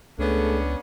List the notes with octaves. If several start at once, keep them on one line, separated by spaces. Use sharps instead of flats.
C#2 A3 B3 C#4 D4 G#4